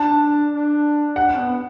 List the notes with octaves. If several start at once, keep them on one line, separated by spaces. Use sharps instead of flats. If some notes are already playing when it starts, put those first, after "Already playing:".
Already playing: D4 A5
D4
D4 F#5
B3